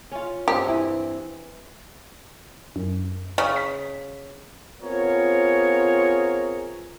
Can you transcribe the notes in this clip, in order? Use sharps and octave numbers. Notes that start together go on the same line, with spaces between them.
C#4 F4
G2 C4 G4
E3
F#2
C#3
B6
B3 C4 F4 G#4 A#4 C#5